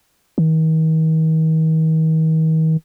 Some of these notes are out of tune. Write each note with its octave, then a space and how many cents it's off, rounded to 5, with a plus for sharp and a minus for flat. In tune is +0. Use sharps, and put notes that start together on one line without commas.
D#3 +40